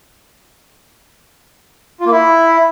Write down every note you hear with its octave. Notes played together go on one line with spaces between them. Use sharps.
F4
A#3
E4